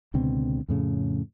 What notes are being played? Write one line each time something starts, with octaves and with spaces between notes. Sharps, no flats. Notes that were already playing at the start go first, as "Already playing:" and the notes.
C#2 B2 D3 C4
F2 A2 C#3